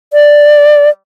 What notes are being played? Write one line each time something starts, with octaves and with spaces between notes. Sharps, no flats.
D5